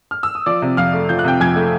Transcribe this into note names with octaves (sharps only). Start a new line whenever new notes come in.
F6
E6
D#6
F3 D5 D6
C3
F2 F5 F6
A3
F3 G6
F#6
C3 G5 G6
F2 G#5 G#6
A3